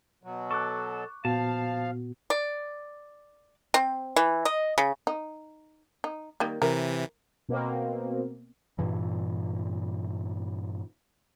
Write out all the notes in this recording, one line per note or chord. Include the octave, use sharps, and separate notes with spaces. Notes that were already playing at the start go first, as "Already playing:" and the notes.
B2 F#3
A4 C#6 D6 F#6
A#2 F3 B3 F#4 F5 A5
D5
C4
E3
D#5
C#3
D#4
D#4
D#3 G3 A#3
C3 E3 A#4
B2 A#3 C4
G2 A#2 E3